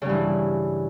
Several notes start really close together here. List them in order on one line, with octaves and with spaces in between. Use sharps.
C#3 G2 E3